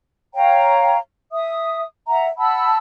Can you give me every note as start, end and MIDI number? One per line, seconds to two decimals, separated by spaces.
0.35 0.97 73
0.35 0.97 77
0.35 0.97 79
0.35 0.97 82
1.32 1.83 76
1.32 1.83 87
2.07 2.27 76
2.07 2.27 78
2.07 2.27 82
2.37 2.78 78
2.37 2.78 81
2.37 2.78 83
2.37 2.78 88